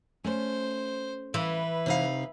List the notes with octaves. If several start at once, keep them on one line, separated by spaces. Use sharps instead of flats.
A3 C#4 C5
E3 B4
C3 D#4 F5